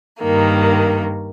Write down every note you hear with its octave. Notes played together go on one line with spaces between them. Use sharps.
G2 D#3 A#3